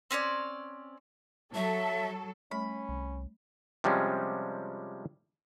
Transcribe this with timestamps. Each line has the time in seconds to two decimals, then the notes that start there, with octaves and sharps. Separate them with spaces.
0.11 C4 C#4 C#5 D5
1.55 F#3 A4 E5
2.51 G3 A3 C#4 B5
2.89 C2
3.84 C3 F3 G3 G#3 C#4